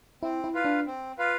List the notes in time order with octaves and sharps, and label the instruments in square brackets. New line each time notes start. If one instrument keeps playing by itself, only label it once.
[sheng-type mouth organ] C4 [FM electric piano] E4
[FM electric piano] E4
[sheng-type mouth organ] F4 B4 F5
[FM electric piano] D4
[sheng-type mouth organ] C4
F4 B4 F5